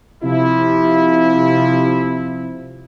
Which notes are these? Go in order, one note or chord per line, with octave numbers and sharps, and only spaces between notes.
C3 F3 E4